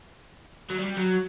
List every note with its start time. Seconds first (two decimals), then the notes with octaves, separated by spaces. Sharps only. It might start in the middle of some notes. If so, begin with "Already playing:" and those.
0.70 F#3
0.78 G3
0.97 F#3